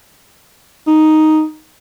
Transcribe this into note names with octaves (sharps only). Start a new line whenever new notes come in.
D#4